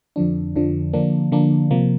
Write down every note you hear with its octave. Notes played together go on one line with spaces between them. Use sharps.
F2 D3 F3 D4
F2 D3 F3 D4
D3 F3 A#3 D4
D3 F3 A#3 D4
C3 F3 A#3